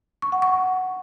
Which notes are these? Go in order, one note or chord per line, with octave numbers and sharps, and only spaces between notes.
C#6
F#5
C#6